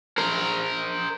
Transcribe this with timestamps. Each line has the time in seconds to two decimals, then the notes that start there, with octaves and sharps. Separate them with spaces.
0.18 A#4 C5